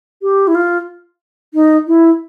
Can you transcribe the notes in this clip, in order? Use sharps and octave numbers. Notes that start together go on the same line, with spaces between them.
G4
E4
F4
D#4
E4